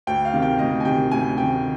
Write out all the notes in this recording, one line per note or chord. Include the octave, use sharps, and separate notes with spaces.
D2 G5
F5
C3 D#3
G5
D2 D#5
G#5
C3 D#3 G5
D2 G#5
C3 D#3 G5